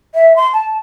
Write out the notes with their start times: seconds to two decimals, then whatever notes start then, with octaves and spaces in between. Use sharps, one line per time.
0.15 E5
0.36 C6
0.54 A5